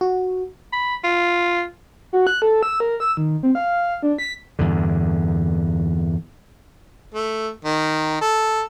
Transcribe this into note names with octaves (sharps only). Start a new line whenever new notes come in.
F#4
B5
F4
F#4
F#6
A4
E6
A#4
E6
D#3
C4
F5
D4
B6
E2 G2 D3
A3
D#3
A4